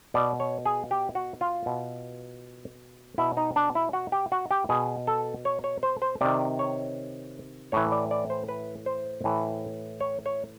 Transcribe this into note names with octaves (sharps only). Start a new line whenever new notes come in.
B2 D5
C#5
G#4
G4
F#4
F4
B2
B2 E4
D#4
D4
E4
F#4
G4
F#4
G4
B2 G#4
A4
C#5
C#5
C5
C5
C3 D#3 D5
C#5
A2 E3 C#5
D5
D5
C5
B4
C5
A2 E3
C#5
C#5